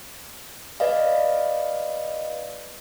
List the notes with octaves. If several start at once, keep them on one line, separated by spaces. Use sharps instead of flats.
B4 D5 D#5 F5